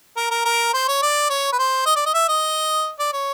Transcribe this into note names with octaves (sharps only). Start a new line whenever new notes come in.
A#4
A#4
A#4
C5
C#5
D5
C#5
B4
C5
D#5
D5
D#5
E5
D#5
D5
C#5